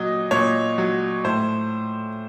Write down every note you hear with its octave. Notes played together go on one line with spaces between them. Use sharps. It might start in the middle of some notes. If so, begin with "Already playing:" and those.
Already playing: A#2 F#3 D#5
A#2 C#5
F#3
A2 C5